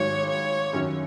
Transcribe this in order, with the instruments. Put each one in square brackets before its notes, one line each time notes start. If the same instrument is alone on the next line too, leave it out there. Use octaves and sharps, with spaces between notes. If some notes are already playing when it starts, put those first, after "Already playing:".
Already playing: [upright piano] G#1 G#2 F#3 [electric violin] C#5
[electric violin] C#5
[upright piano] F#2 D#3 F#3 C#4